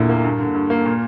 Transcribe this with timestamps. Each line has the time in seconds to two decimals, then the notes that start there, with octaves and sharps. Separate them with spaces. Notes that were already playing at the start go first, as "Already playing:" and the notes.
Already playing: E2 A#2 D3 E4
0.09 A#3
0.24 G2
0.40 D3
0.55 G2
0.70 A#3
0.85 A#2